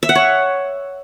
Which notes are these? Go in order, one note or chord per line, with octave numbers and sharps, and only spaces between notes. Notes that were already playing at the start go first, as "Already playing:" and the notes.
E5
F#5
C#5